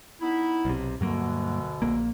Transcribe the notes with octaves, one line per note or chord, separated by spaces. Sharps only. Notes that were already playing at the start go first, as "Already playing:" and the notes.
B3 D#4 E4
B1 C3
D2 G2 B2 D3 F#3 A#3
A#1 A#2 A#3